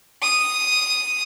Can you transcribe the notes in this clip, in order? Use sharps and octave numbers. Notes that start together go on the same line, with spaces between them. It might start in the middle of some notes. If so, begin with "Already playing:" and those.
D#6